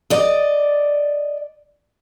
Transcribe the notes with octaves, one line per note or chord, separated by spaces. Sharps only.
D5 D#5